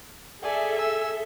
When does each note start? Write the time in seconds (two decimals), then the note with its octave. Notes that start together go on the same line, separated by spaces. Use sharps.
0.42 G#4 A4 D5 E5 G#5
0.76 G#5 E6